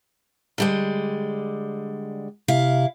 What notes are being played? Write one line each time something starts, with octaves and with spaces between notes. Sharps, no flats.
D3 G3 G#3
C3 E4 F5